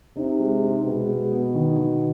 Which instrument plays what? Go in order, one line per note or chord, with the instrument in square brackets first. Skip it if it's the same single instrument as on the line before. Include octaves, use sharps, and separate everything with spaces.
[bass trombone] C3 [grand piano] D#4
[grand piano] G#3
D#4
[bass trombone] B2 [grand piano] G#3
[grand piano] G#3
B3
D#3
D#3